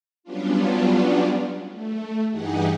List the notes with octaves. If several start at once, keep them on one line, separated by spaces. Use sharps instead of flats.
F#3 G3 B3 C#4 D4 F4
A3
G2 E3 D#4 G4 G#4 F#5